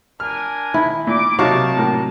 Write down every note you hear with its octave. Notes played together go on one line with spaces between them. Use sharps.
D4 A#4 G#5 F6
D#3 E4
A#2 D6
C3 F#3 D#4 A#4 F5 A5 C#6
A2 A#3